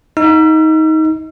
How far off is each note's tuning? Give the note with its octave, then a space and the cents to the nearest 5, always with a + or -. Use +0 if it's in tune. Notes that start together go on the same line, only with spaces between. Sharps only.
D#4 +20 E6 +45